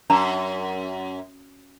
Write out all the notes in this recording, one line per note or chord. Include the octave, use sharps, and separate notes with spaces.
F#2 D4 A5 A#5